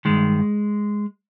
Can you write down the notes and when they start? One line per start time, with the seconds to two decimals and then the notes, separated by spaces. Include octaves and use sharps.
0.05 G2 D#3 G#3